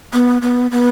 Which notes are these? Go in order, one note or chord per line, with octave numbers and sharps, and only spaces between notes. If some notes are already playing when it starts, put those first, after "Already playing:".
B3
B3
B3